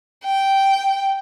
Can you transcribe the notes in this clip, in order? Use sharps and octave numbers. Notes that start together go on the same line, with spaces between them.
G5